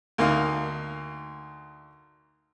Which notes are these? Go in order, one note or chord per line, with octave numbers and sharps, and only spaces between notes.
D2 A#3 D#4 F5